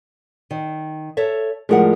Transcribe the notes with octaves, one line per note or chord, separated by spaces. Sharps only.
D#3
A4 C#5 E5
A2 F3 G3 G#3 A#4 F#5